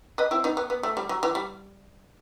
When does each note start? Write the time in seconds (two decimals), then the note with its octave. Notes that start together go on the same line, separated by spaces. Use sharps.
0.18 B4 D#5
0.31 C4 E4
0.44 B3 D#4
0.57 B3
0.70 B3
0.83 A3
0.97 G3
1.09 F#3
1.23 E3
1.35 G3